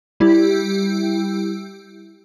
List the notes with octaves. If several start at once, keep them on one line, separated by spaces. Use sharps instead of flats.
G3 E4 G4